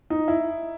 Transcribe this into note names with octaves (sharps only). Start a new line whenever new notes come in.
D#4
E4